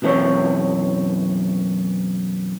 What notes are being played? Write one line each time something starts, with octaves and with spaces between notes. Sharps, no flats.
B1 F#2 E3 C4 C5 C#5